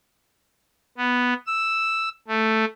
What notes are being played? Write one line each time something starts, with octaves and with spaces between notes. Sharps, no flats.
B3
E6
A3